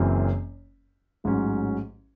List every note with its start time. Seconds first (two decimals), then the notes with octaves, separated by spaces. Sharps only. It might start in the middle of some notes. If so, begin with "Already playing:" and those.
Already playing: F#1 F#2 E3 C4
1.24 A1 G#2 F#3 C#4